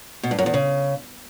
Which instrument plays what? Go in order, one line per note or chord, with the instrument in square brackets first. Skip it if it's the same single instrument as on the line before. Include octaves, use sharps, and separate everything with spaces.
[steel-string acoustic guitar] B2
G2
F#2
E2
C#3